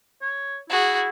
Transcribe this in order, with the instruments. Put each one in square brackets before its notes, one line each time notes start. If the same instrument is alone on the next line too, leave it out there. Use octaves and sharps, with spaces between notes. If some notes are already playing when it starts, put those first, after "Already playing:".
[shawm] C#5
[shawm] E4 [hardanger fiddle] F#4 G#4